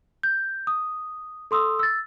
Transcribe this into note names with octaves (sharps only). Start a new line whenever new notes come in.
G6
D#6
A4 C6 D#6 E6
E6 A6